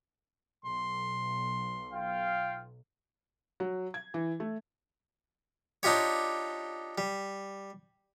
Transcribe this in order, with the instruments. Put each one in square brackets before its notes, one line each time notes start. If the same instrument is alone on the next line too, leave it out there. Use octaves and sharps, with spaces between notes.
[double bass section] B1 [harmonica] C6
[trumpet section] F4 F5 G5
[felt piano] F#3
G#6
E3
A3
[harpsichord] D4 D#4 F4 G4 C#5
G3